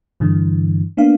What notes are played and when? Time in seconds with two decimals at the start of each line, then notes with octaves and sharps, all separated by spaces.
0.20 G2 D3 E3
0.97 A#3 B3 D4 F5